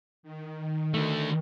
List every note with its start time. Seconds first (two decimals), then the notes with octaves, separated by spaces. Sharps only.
0.23 D#3
0.94 D3 A3